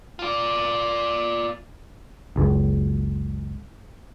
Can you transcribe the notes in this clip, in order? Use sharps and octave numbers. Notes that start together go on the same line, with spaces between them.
F4 D5
F#1 C#2